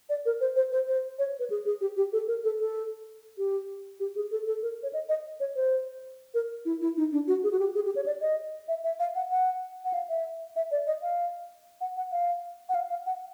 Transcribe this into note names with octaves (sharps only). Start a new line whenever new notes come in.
D5
A#4
C5
C5
C5
C5
C#5
B4
G#4
G#4
G4
G4
A4
A#4
A4
A4
G4
G4
G#4
A4
A4
A#4
C#5
D#5
D#5
C#5
C5
A#4
E4
E4
D#4
D4
F#4
G#4
F#4
G4
G#4
G4
C#5
D5
D#5
E5
E5
F5
F#5
F#5
F#5
F5
E5
E5
D5
D#5
F5
F#5
F#5
F5
F#5
F5
F5
F#5